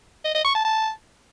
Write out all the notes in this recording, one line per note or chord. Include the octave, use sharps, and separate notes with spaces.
D#5
D#5
C#6
A5
A5